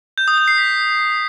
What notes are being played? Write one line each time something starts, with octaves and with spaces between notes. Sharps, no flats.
G6
D#6
G6
C7
B6